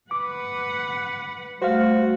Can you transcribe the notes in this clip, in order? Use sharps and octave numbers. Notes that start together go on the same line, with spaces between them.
B4 F#5 D6
G3 A3 F#4 C5 F5